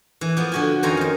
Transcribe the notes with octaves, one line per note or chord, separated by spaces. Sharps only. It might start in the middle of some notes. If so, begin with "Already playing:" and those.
E3
F3 B3
D3 F#4 G#5
F2 D#3 C#4 C5 G#5 A#5
D#3 C5